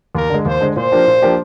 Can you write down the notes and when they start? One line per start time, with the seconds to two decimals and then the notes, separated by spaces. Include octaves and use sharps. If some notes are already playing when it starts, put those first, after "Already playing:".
0.15 D#2 A#4
0.30 D3 G#3
0.45 D#2 C5
0.61 D3 G#3
0.76 A#2 C5
0.92 F3 A#3 D4 G4
1.07 A#2
1.22 F3 A#3 D4 G4